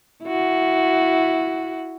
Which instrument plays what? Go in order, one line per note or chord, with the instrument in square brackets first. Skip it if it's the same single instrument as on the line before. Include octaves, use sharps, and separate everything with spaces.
[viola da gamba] E4 F#4